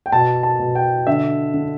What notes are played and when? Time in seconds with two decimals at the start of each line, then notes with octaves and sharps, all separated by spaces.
0.06 G5
0.12 B2 A5
0.43 A5
0.59 B2
0.75 G5
1.07 D3 E5
1.54 D3